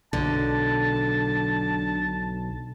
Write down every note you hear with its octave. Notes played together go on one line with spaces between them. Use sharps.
B1 D3 A5